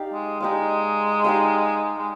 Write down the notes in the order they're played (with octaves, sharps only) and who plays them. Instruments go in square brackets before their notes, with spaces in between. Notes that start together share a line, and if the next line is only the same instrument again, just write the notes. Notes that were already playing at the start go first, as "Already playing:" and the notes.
Already playing: [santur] D#4 G4 D5 F5
[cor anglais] G#3
[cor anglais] G#3 [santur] D#4 G4 D5 F5
[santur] D#4 G4 D5 F5
[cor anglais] G#3